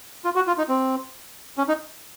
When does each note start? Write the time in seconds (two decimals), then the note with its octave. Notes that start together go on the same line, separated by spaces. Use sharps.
0.25 F4
0.35 F#4
0.47 F4
0.58 D#4
0.69 C4
1.58 C#4
1.68 D#4